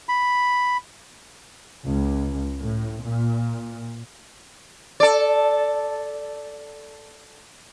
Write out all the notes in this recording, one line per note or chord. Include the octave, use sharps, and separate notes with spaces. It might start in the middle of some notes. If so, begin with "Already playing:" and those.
B5
C#2
A2
A#2
A4 D5